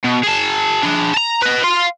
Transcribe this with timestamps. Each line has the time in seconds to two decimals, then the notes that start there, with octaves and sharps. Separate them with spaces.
0.05 B2
0.23 G#4 A5
0.83 D4 G#4
1.14 A5 A#5
1.42 B4 D#5
1.64 F5 C6